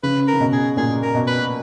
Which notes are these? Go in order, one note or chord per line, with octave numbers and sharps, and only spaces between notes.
C#3 B4
A#4
C#3
B2
G#4
A#2 G#4
A#4
B2
B4